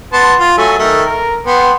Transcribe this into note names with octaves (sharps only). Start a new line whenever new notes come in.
B3 A5 C6
F4
F#3 A3 G#5
D#3 A3
A#4
B3 G5 C6